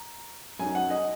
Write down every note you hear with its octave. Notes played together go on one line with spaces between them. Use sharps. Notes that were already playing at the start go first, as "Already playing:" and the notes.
Already playing: A#5
F#2 F#3 D#4 G#5
F#5
D#5